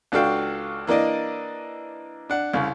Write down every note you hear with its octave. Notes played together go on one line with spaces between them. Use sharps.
C#2 D4 F#4 A4 F5 G5
E3 A#3 D4 D5 D#5
D4 F#5
C2 C#3